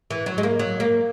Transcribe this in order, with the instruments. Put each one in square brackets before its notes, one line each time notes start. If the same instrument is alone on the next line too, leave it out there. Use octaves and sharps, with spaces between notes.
[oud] E3
F#3
G#3
A#3
F#3
A#3